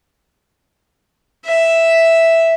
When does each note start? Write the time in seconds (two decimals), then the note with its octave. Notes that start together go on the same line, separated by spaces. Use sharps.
1.46 E5